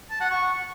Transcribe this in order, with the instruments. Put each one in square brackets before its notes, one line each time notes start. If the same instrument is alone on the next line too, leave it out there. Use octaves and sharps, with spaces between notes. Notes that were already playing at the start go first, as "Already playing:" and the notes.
[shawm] A5
F#5
C#6